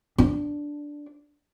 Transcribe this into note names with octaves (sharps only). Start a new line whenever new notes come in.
D4